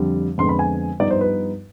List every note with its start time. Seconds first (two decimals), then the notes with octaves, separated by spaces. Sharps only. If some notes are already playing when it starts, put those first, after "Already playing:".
Already playing: F2 D3 G3
0.38 F2 D3 G#3 B3 C6
0.49 B5
0.59 G#5
1.00 G2 F3 B3 D#4 D5
1.11 C5
1.21 B4